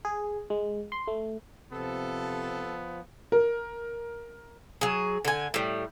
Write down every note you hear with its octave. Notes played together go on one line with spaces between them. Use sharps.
G#4
G#3
C6
A3
C3 F3 B3 A4
A#4
F#3 G#4
D3 G#5
A2 G3